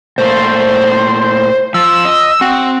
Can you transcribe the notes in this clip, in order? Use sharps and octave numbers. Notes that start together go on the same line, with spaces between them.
A#2 A3 C5
F3 E6
D#5
C4 F#4